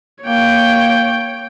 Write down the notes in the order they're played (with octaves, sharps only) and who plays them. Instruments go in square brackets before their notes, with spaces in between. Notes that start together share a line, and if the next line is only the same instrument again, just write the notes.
[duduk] A#3 [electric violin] C#5 G5